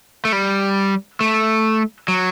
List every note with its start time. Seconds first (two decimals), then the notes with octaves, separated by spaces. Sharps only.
0.25 A3
0.33 G3
1.21 A3
2.08 F#3